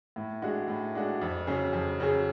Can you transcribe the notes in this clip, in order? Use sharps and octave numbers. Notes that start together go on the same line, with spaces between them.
A2
G#3 D4 F#4
A2
G#3 D4 F#4
F2
C#3 F#3 C#4 G#4
F2
C#3 F#3 C#4 G#4